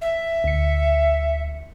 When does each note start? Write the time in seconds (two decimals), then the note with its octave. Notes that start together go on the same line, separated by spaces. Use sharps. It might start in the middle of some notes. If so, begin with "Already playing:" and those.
0.01 E5
0.44 D2 C#7